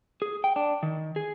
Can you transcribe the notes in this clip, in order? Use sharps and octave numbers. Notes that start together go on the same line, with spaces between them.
G#4
G5
D4
D#3
G#4